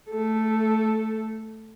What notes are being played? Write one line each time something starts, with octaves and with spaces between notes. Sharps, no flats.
A3 A4